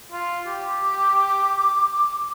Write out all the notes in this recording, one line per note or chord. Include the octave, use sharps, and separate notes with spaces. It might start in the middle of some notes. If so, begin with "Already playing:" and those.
F4
G4
D6